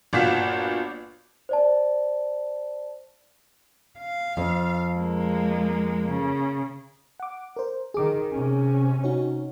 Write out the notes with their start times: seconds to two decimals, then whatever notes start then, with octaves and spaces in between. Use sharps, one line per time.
0.13 G1 A#2 F#4 F5 B6 E7
1.49 C5 D5 A5
4.00 F5
4.37 F2
4.95 G#3 A#3
6.08 C#3
7.20 F#5 D6
7.56 A#4 C5
7.94 D#3 G#4 D6
8.33 C3 C#4
9.04 D#4 F#4 C#5